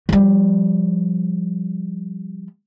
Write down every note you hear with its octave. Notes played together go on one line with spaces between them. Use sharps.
F3 G3